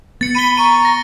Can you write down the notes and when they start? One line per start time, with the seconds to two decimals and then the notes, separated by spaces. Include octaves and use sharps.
0.21 B3 A6 C#7
0.35 B5 D#7 G7
0.57 A#5 C#6 D#7
0.85 A#6